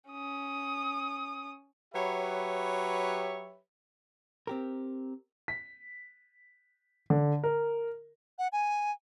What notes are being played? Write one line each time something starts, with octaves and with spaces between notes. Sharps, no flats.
C#4 D#6
F#3 G4 B4 C#5 E5 B5
C4 G4 A#4
B6
D3
A#4
F#5
G#5